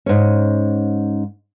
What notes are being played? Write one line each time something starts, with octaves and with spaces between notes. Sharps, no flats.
G#2 C#4